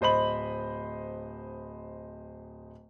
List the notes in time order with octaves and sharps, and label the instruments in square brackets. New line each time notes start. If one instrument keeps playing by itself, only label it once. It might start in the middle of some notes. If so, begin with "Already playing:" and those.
[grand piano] D1 C5 D#5 B5 F#7